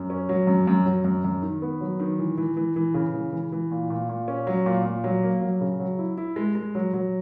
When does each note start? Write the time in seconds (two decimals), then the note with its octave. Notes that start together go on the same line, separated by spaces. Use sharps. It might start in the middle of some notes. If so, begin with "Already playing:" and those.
Already playing: F#2
0.10 C#4
0.29 F#3
0.47 F#2
0.67 F#2
0.86 F#3
1.05 F#2
1.24 F#2
1.42 D#3
1.62 B3
1.81 F#3
2.00 D#3
2.19 E3
2.38 E3
2.57 E3
2.76 E3
2.94 C#3
3.14 E3
3.33 E3
3.52 E3
3.71 A#2
3.90 A#2
4.09 A#2
4.28 C#4
4.47 F#3
4.66 A#2
4.85 A#2
5.04 F#3
5.23 A#3
5.41 F#3
5.61 C#3
5.80 F#3
5.99 E4
6.17 E4
6.36 G#3
6.55 G#3
6.75 F#3
6.94 F#3